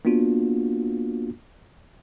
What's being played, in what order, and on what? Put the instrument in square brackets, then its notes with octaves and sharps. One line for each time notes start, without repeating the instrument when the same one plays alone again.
[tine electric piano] A#3 B3 D4 F4 F#4